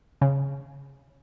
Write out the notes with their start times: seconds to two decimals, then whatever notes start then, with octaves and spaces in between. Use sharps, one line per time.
0.21 C#3